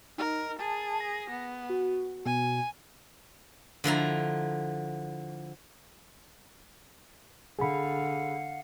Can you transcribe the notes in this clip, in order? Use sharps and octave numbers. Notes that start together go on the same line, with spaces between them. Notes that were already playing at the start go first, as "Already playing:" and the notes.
D#4 A#4
G#4 A5
A#6
B3
F#4
B2 G#5
D3 F3 E4 A#5
D3 G#4 F5 F#5 B5